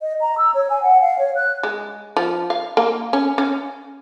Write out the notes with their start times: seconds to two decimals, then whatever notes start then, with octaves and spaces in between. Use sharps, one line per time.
0.01 D#5
0.21 A#5
0.38 E6
0.54 C#5
0.70 G#5
0.83 F#5
1.01 F5
1.19 C#5
1.36 F#6
1.63 G#3
2.17 F3
2.50 F5
2.77 A#3
3.13 C#4
3.38 C#4